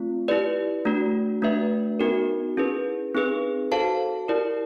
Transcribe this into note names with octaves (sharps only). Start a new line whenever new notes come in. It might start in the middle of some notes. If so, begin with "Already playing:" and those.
Already playing: A3 C4 F4
E4 G4 B4 D5
A3 D4 F#4
A3 D4 F#4 B4 E5
B3 D#4 F#4 A#4
C#4 E4 G#4 B4
C4 D#4 G#4 B4
F#4 A4 C5 F5 A5
E4 G4 A#4 D5